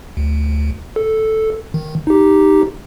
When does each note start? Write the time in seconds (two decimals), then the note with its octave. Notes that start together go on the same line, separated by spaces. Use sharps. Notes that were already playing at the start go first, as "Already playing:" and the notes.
0.17 D2
0.96 A4
1.74 D#3
2.07 D#4 G4